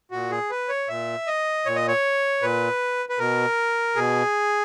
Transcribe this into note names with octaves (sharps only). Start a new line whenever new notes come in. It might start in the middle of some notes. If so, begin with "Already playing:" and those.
A#2 F#4
G#4
B4
C#5
A#2 E5
D#5
A#2 C#5
D#5
C#5
A#2 B4
B4
B2 A#4
B2 G#4